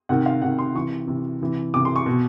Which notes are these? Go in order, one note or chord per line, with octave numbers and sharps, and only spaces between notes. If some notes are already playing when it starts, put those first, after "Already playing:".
C3 D#3 F#5
F5
C3 D#3 F#5
C6
C3 E3 C#6
C3 E3
C3 E3
C3 E3 D6
C6
C#6
B2